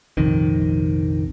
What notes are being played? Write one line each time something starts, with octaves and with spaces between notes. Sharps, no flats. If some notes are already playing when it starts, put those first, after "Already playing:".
A#1 F2 C3 D#3